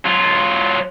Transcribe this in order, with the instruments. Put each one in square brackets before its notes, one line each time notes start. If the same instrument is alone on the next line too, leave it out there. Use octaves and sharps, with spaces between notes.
[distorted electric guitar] F#3 F4